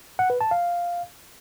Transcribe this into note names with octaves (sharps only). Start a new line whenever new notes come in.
F#5
B4
A5
F5